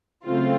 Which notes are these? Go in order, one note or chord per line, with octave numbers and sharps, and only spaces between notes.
C#3 F#3 A3 C4 F4